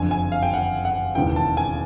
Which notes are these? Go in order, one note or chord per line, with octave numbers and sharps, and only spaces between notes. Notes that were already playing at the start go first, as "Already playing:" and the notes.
Already playing: F#1 F2 D3 G#5
G#5
F5
G5
F#5
F#5
E1 D#2 C#3 E3 G5
A5
G#5